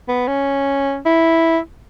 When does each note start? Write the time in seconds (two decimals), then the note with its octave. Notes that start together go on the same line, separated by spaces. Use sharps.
0.08 B3
0.28 C#4
1.06 E4